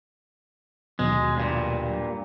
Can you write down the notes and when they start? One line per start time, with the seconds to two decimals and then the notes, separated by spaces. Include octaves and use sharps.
0.99 D#2 B2 F#3 G#3
1.37 G2 A#2